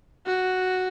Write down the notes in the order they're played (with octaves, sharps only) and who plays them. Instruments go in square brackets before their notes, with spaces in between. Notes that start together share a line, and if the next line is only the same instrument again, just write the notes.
[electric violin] F#4